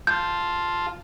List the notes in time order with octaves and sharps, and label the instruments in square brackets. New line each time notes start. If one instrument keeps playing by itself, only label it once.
[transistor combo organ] F4 A5 [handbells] G6